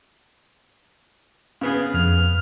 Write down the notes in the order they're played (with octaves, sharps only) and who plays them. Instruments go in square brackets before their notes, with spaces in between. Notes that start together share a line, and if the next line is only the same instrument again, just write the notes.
[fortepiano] C#3 B3 G#4
[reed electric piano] F2 [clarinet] F6